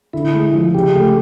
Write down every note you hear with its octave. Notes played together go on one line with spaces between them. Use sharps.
D3 E4
G#3
F3
C#3 G4
A3